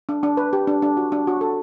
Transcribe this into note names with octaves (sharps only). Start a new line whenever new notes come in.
D4
D4
B4
G4
D4
D4
F#4
D4
F#4
A4